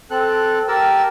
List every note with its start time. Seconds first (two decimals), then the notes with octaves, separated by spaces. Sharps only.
0.10 C4 A4 F#6
0.68 G4 A#4 A5 E6